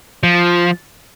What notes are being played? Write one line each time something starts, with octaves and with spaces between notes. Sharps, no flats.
F3